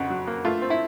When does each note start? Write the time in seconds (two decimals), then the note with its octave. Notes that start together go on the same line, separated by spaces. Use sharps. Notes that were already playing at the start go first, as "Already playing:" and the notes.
Already playing: F2 C#3 F#4
0.10 F#3
0.27 A#3
0.45 A3 F4
0.62 C4
0.70 E4